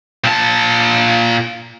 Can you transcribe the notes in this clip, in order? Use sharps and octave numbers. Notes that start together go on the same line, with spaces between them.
A#2 A5